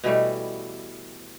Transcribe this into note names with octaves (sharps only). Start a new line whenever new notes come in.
B2 E3 G3 A3